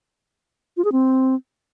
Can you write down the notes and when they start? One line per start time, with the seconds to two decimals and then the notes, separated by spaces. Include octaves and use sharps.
0.77 F4
0.85 G#4
0.92 C4